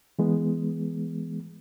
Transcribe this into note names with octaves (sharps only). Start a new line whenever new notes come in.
E3 G#3 B3